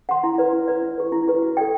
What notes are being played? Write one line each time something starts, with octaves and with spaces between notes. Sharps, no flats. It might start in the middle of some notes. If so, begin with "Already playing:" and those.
F#5 C6
E4
B4 D5
E4
B4 D5
E4
G4 B4
E4
G4 B4
F#4
A4 D5 G5